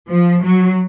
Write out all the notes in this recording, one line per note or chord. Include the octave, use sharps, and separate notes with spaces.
F3
F#3